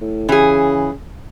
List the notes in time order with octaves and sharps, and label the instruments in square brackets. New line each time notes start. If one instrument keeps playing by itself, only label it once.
[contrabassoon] A2
[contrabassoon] C#3 [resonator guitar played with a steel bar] E3 G#4